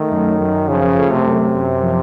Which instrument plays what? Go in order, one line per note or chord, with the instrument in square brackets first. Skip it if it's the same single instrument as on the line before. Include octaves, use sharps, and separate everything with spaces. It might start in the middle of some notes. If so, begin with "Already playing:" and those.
Already playing: [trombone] D#3 [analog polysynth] A3
[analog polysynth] F#2
F#2
[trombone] C#3 [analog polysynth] F3
[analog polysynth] A3
[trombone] C3
[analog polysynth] F#2
F#2
F3